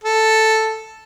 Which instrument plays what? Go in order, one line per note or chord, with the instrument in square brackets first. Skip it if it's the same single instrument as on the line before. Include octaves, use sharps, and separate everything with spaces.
[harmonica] A4